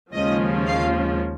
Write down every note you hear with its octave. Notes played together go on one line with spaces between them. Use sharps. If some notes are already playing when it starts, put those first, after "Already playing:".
D#2 C#3 F3 G#3 C#4 D#5
F5